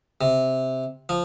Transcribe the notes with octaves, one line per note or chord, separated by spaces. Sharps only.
C3
F3